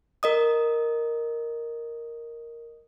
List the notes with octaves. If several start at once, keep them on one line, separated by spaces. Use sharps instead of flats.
A#4 D#5 D#6